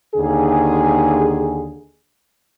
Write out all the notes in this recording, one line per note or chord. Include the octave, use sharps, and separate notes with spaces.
D#2 D3 G#4